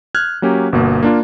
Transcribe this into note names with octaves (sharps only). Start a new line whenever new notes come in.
F6 F#6 G#6
F#3 A#3 C#4 G4
G1 B2 A#3
A#3 D4 F4